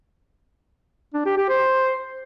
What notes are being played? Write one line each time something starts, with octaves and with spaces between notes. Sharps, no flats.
D4
G4
G4
C5